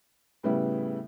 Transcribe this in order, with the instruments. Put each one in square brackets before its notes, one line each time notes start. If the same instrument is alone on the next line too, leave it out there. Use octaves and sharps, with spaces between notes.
[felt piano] A2 C#3 G3 B3 E4